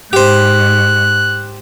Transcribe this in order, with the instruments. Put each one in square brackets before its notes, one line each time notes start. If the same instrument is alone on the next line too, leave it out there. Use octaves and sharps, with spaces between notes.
[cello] G#2 [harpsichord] G4 C5 [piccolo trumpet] F#6